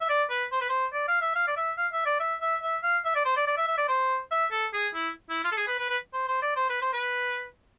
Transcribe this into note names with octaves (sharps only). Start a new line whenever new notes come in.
E5
D5
B4
C5
B4
C5
D5
F5
E5
F5
D5
E5
F5
E5
D5
E5
E5
E5
F5
E5
D5
C5
D5
D5
E5
E5
D5
C5
E5
A4
G#4
E4
E4
F4
A4
G#4
B4
B4
B4
C5
C5
D5
C5
B4
C5
B4